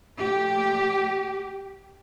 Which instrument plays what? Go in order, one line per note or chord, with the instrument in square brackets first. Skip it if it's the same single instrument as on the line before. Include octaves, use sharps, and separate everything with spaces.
[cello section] A#2 F3 A3 G4